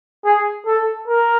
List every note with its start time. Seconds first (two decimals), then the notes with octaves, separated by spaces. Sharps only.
0.25 G#4
0.66 A4
1.08 A#4